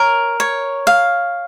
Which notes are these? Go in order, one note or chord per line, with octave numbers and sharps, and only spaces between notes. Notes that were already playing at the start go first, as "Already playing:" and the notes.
Already playing: A#4 C#5
C#5
F5